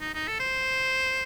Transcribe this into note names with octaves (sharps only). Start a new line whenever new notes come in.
D#4
D#4
A4
C5